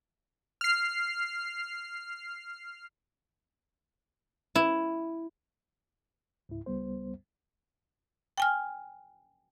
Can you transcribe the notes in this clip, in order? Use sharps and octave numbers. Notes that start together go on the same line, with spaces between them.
F6 C7
E4
C#2 G#2 E4
C#2 G3 B3 C5
G5 G#5 F6